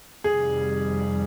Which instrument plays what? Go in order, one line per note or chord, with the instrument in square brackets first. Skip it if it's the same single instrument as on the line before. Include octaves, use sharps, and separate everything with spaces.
[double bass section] F2 C3 D#3 G3 [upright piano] G#4